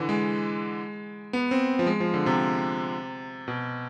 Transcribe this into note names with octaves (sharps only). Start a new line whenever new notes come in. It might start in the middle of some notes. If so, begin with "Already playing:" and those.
Already playing: D3 E3
G#3
B3
C4
F3
G#3
F3
D3
C3
B2